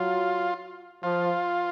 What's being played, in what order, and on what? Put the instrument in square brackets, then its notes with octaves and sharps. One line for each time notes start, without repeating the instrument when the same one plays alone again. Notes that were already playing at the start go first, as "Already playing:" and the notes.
Already playing: [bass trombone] F#3 [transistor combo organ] F4
[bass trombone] F3 [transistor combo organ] F4